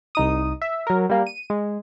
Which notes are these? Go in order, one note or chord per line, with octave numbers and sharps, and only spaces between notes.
C2 D#4 D#6
E5
F#3 A#4
G3 A#3
D#7
G#3